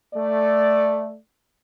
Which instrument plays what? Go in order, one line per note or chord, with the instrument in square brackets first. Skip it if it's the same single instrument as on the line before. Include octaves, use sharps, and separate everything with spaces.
[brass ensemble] A3 D5